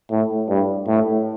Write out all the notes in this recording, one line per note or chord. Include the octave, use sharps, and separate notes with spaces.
A2
G2
A2